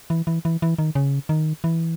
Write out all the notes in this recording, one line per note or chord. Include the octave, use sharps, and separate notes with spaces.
E3
E3
E3
E3
D#3
C#3
D#3
E3